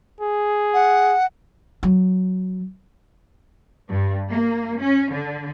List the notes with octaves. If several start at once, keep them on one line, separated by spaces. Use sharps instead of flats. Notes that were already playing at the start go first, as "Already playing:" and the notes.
G#4
F#5
F#3
G2
A#3
C#4
D3